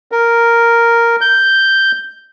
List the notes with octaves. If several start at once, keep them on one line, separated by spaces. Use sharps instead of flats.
A#4
G6